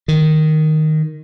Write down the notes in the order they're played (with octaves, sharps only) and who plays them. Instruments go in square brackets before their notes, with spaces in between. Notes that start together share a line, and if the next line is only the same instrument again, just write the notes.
[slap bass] D#3